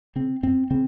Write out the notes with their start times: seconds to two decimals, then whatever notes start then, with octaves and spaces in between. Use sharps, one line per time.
0.16 C#3 C4
0.43 F#2 C4
0.70 C#3 C4